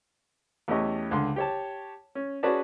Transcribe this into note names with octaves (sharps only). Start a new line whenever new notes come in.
E2 A3 C#4 G4 D#5 C#6
C#2 D3 C6
G4 C#5 A5
C#4
C#4 F#4 G#4 B4 D5 A5